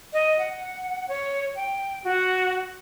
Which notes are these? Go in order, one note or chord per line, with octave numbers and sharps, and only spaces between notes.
D#5
F#5
C#5
G5
F#4